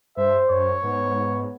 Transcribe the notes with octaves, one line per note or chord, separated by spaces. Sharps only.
G2 C5 E5
F#2 C#5
G#2 B3